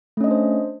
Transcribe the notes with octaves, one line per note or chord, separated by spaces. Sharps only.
A3 C#4 D4 C5 D#5